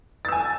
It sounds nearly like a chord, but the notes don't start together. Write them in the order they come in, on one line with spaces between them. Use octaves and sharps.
A6 E6 G#5